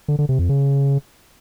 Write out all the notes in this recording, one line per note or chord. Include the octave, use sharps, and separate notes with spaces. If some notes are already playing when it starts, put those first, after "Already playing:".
D3
D3
C3
F2
C#3